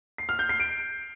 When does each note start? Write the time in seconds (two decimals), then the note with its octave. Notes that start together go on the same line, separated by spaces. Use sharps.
0.18 C7
0.29 F6
0.39 G6
0.49 C7
0.60 D7